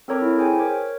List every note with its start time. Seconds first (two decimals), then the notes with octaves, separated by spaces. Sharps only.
0.08 C4 A4 A#4 C#5 A#5 D6
0.22 E4
0.38 G#4 C5 G5 G#5
0.60 A#4 C#5 D6